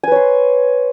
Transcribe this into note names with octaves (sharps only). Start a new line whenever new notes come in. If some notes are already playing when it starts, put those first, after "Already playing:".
B4 C#5 G#5 C6